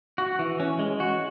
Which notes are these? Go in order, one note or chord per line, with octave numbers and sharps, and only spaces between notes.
F#4
E3
C#4
G#3
F#4